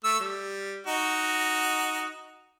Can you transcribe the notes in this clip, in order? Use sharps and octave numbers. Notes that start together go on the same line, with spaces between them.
A3 E6
G3
D#4 F#4